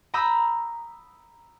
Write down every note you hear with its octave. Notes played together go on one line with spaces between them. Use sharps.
A#5 B5 D#6 E6 G6